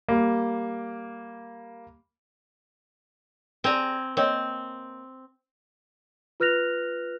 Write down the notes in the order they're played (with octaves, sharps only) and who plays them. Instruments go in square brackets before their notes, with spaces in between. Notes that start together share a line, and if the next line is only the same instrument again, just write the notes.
[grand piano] G3 A#3
[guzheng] C4 G#5 A#5 [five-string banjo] G#4 D5
[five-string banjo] A#3 C#5 D#5 [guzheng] C4
[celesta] F4 B4 F6 F#6 A#6 F7